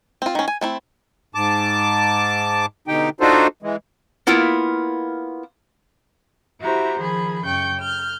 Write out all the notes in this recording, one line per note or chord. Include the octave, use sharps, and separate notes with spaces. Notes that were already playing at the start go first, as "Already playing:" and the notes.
C4 F4
D#3 C#4
G#5
A3 C4 E4
G#2 A5 D6
B2 D3 D#4 G4 G5
D4 D#4 F4 F#4 A4 C5
E3 G#3
A#3 B3 E4 F4 A#4
E4 F#4 G4 C5 A#5
D#3 F3 G#4 B5
F#2 C#3 G5 C#6 G6
F6 G6